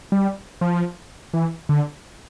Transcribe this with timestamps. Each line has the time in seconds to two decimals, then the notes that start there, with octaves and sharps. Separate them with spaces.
0.12 G3
0.61 F3
1.34 E3
1.69 D3